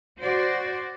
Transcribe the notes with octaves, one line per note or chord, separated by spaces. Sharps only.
F#4 C5 D5